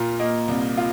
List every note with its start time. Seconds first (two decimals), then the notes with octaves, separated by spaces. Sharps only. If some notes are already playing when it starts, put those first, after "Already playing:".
Already playing: A#2 F4 A#5
0.19 A#3 D#5
0.48 C2
0.77 F4